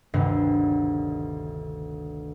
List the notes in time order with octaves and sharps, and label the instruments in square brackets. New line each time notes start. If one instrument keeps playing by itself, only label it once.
[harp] G1 D2 G2 C3 D#3 C7